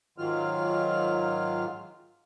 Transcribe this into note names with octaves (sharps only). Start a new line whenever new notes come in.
G#2 D#3 F#3 F4 F6